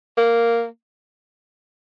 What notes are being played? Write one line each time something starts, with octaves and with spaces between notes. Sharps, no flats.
A#3